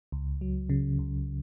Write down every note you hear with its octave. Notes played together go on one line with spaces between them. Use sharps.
C#2
F#3
C#3
C#2